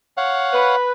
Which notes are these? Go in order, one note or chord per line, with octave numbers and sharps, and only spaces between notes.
C#5 F5 F#5
B4